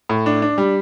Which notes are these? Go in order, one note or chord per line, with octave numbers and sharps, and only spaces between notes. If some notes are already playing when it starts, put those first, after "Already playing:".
A2
D4
D4
G3